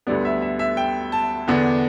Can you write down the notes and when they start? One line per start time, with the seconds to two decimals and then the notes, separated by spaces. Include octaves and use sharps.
0.07 D2 D3 G3 B3 D5
0.25 E5
0.42 E5
0.59 E5
0.77 G5
1.12 A5
1.47 E2 D3 B3 D4